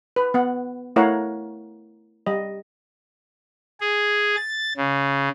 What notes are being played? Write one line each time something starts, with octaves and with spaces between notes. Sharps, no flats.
B4
B3 F#5
A3 E4 A#4 C#5 F5 F#5
G3 D#5
G#4
A6
C#3